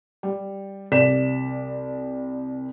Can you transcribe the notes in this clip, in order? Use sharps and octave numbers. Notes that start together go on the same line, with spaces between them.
G3
C2 D5 B6 E7